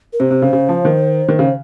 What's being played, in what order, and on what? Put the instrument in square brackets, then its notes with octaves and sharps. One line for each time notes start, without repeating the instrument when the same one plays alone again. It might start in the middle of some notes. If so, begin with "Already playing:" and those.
[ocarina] A#4
[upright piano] C3 [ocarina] C5
[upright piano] C3
C#3
C#3
F3
D#3
D#3
C#3